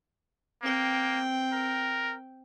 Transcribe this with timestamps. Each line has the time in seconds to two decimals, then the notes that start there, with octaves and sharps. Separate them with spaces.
0.63 A#3 C4 G5
1.53 A#4